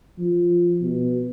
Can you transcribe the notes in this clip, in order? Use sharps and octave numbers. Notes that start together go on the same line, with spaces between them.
F3
B2